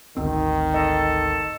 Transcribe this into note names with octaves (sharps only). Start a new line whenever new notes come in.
G#1 D2 D#3 C4
A4 D#5